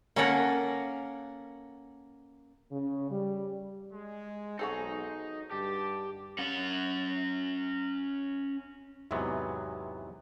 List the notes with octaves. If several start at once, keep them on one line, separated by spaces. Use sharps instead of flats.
A#3 C#4 A4 A#4 F#5
C#3
G3
G#3
B1 D#4 F#4 G#4 A4 C5
G2 D3 G4 A5
C#4 F#5
E2 G#2 C3 E3 F#3 B3